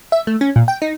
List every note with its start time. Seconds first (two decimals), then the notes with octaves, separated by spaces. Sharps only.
0.12 E5
0.27 A3
0.41 C#4
0.56 A#2
0.68 G5
0.82 D#4